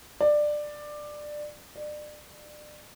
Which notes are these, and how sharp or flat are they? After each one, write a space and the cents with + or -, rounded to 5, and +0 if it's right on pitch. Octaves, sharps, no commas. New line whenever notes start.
D5 +15
D5 +30